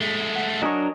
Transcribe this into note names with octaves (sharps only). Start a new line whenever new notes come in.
G#3 A3
F#5
F#3 D4 A#4 D#5 G#5 C#6